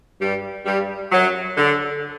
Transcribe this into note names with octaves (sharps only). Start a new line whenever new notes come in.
G2 G3
G2 G3
F#2 F#3
D3